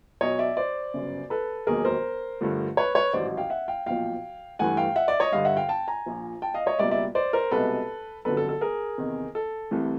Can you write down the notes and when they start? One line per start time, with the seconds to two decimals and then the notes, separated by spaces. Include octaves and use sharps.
0.21 B1 B2 F#3 C#5 D#5
0.39 D5 E5
0.57 C5 D5
0.94 G1 F#2 C#3
1.30 A4 B4
1.67 E1 D#2 D#3 F#3 G#4 A#4
1.85 A#4 C5
2.41 G2 D3 F3 A3
2.77 B4 C#5
2.95 B4 C#5
3.13 A1 G#2 D#3 F#3 C5 D5
3.37 F5 G5
3.50 E5 F#5
3.68 F5 G5
3.86 B1 A#2 F3 F5 G5
4.59 G2 E3 A3 F#5 G#5
4.77 F5 G5
4.96 E5 F#5
5.08 D5 E5
5.20 C#5 D#5
5.32 G2 D3 G3 D#5 F5
5.45 E5 F#5
5.57 F5 G5
5.69 G5 A5
5.88 G#5 A#5
6.06 A#1 A#2 F3
6.42 G5 A5
6.54 D#5 F5
6.66 C#5 D#5
6.79 C#2 B2 G3 A#3 D5 E5
6.91 D5 E5
7.15 C5 D5
7.33 A#4 C5
7.51 C2 B2 G#3 A4 B4
8.25 G1 F2 D3 F#3 A4 B4
8.37 A4
8.49 A4
8.61 G#4 A#4
8.98 E2 C3 D#3
9.35 A4
9.71 C2 C3 E3 A3